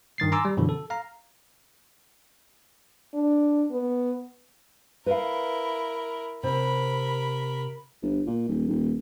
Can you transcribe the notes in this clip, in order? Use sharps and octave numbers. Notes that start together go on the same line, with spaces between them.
G2 D#3 A6 C7
G#5 A#5 C6 D6 E6
G3
F#2 B2 D3 E3 F3
A4
F5 A#5
D4
B3
E4 A#4 B4 F5
C3 A#4 B5
G1
A#2
D#1
D#1